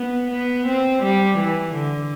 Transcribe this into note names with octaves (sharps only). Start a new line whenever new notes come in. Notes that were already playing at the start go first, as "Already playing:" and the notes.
Already playing: B3
B3
C4
G3
E3
D3